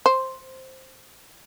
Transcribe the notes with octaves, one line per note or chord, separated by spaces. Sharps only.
C5